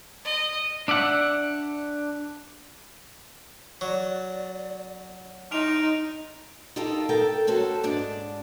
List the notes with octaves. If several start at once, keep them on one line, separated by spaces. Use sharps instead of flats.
D#5
D4 D5 E5 F#5
F#3 D5
D#4 C6 F6 D7 F7
D#4 F4 G4 A4 A#4 D#5
A4 A#4 G5
C#4 F#4 A4 C5
G#2 D4 D5